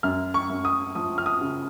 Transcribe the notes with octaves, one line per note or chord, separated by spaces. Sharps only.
F#2 F6
C#6
F#2
D#6
F3 D#6
F6
D#6
C#3